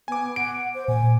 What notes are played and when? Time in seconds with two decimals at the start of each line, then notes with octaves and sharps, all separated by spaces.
0.08 B3 G#5 D6
0.36 F#5 D7
0.75 C5
0.88 A#2 G#5